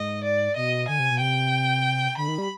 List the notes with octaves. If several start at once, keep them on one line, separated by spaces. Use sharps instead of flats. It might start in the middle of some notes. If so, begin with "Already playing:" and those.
Already playing: G#2 D#5
D5
B2 D#5
D3 G#5
C3
B2
C3 G5
D3 B5
D#3
G3